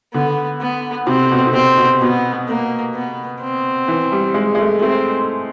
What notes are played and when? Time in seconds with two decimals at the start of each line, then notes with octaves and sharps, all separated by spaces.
0.14 D3 B3
0.61 B3
1.07 C3 C4
1.31 B2
1.47 C3
1.54 B2 C4
1.77 B2
2.01 B2 B3
2.48 A#3
2.95 B3
3.41 C4
3.88 E3
4.12 G3
4.34 G#3
4.55 G#3
4.58 A3
4.81 A3 C4